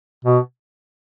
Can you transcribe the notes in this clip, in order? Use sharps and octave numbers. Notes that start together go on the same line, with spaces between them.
B2